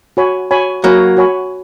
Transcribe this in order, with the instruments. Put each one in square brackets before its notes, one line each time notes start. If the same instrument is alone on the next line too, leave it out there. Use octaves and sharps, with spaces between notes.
[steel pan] F#4 C#5 G#5 B5
F#4 C#5 G#5 B5
[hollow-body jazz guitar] F#3 A#3 [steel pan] F#4 C#5 G#5 B5
[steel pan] F#4 C#5 G#5 B5